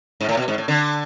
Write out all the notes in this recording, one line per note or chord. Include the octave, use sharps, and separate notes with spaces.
G#2
A2
B2
G#2
A2
D3